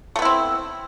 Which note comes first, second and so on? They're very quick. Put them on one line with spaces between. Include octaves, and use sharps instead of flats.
A3 B3 E4 C4